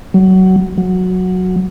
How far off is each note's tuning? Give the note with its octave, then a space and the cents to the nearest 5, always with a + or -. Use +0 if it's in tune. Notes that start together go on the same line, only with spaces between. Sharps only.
F#3 +20
F#3 -10